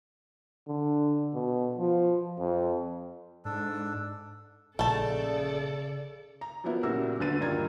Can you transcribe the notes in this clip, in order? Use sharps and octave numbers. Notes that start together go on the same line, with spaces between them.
D3
B2
F3
F2
G#2 D4 A4
A#1 C#3 A3 A4 D5 A5
A#5
F3 F#3 A#3 B3 E4
A#2 C#3 F#3 F#4 G4 E6
D#1 D2 D3 B4 A6 D#7
G2 D#3 F4 A#5 G#6